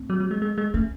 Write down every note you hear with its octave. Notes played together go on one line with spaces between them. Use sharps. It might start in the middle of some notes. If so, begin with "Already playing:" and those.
Already playing: C4
F#3
F#3
G#3
G#3
G#3
A3 C#4